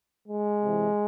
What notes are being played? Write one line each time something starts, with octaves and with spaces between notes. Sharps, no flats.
G#3
C3 E3